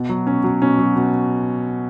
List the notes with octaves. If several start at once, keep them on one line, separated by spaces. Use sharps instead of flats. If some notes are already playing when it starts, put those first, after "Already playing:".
Already playing: B2
F#3
B2 C#4
F#3
B2 C#4
F#3
B2